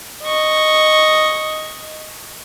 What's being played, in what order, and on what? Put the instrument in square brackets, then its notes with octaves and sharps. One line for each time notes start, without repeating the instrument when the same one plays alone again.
[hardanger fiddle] D#5 C#6